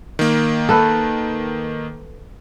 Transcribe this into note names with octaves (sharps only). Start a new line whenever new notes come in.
D#3 A#3
A4 B4